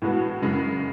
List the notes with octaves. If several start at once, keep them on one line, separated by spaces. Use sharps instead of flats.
A2 E3 G#3 B3 F#4
F#2 C#3 E3 G#3